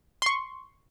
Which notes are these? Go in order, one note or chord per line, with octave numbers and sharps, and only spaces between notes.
C6 C#6